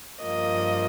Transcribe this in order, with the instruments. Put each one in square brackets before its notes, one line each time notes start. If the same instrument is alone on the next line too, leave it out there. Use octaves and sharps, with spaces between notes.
[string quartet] G2 F3 A#3 D#5